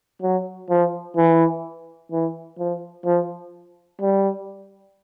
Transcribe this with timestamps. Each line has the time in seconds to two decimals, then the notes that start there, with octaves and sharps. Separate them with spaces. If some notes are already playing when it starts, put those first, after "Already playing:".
0.22 F#3
0.70 F3
1.16 E3
2.12 E3
2.59 F3
3.06 F3
4.01 G3